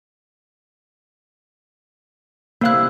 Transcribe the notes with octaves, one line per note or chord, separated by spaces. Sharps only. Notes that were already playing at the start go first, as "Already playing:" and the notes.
C3 A#3 E4 F5 F#6